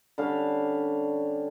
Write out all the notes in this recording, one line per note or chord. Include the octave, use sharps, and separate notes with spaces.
D3 G3 C#4 F5